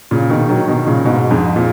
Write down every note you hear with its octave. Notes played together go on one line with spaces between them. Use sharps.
A#2 C#3
B2 D#3
D#3 F#3
B2 D#3
A#2 C#3
G#2 B2
F2 G#2
A#2